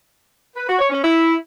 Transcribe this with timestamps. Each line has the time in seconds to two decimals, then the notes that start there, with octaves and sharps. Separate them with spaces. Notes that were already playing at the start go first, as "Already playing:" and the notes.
0.55 B4
0.67 F#4
0.78 C#5
0.90 C#4
1.01 E4